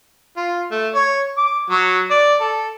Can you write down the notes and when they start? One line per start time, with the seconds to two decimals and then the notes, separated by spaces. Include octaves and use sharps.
0.37 F4
0.71 A3
0.94 C#5
1.38 D6
1.70 F#3
2.11 D5
2.41 A4